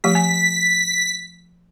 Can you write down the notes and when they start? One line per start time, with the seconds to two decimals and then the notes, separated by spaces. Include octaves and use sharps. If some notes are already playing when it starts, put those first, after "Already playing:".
0.04 F3 A3 G4 B6
0.15 G#5